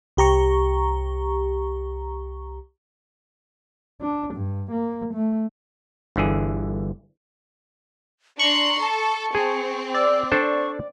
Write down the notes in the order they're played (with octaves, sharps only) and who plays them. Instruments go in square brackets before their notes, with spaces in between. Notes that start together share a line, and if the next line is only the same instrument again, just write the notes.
[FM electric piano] C2 G4 A#5 C#6
[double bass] D4
G2
A#3
A3
[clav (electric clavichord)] G1 D3 E3 G#4
[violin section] D4 A#5 C6 [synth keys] C#6 C#7 [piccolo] F#7
[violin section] A4 [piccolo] A5
[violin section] C4 [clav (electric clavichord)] G#4
[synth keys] D5 [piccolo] E6
[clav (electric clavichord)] D4 A4 C5 [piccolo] C#6